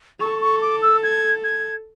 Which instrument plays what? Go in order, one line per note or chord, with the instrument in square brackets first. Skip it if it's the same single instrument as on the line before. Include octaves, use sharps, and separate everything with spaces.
[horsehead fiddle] A4 [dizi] C#6
[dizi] C#6
D6
E6
G#6
G#6